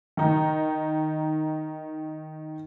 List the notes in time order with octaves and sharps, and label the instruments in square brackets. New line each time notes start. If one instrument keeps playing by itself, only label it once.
[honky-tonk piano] D#3 D#4